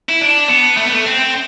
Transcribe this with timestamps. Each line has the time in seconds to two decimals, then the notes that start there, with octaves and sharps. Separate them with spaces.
0.09 E4
0.21 D4
0.49 B3
0.77 A3
0.85 B3
0.92 A3
1.06 C4